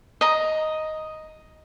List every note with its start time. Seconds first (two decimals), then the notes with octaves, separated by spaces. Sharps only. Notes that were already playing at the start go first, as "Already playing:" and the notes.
0.21 D#5 A#5